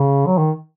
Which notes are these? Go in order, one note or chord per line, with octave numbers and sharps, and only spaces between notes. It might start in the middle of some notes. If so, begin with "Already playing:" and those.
Already playing: C#3
F#3
D#3